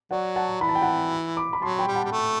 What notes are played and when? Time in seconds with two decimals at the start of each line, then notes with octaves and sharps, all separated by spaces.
0.11 F#3 D5 F#5
0.36 F#5 A5
0.61 E3 B5
0.69 A5
0.75 G5
0.82 F#5 A5
1.37 B5 D6
1.53 B5
1.62 F#3 A5 C6
1.79 G5 B5
1.88 G3
1.95 F#5 A5
2.04 G3
2.12 A3